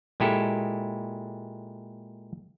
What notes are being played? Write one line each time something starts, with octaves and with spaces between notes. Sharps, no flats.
A#2 G#3 E4 G4 A4